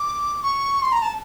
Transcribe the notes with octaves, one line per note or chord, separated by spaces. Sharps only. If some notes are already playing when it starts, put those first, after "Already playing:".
Already playing: D6
C#6
C6
A#5
A5